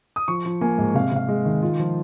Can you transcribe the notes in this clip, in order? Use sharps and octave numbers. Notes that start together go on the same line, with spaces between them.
D#6
F3 C#6
F3
A#3 G#5
G#2
C3 F5
C3 F5
G#3
D#3
F4
F3